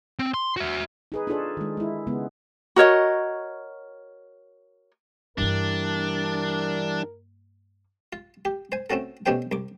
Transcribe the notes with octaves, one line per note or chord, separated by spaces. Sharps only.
C4
C6
F#4 E5
D#4 G#4 B4
D4 D#4 F4 G#4 A4 C#5
D#3 G#3
G#3 E4
C#3 G#3 B3
F#4 A#4 C#5 D#5
G2 E3 G3 A#3 D4 A#4
F4
G4
C5 G#5
A3 C4 C#4 F#4 A4
B2 A3 C#4 G4 C5 G5
C2 D6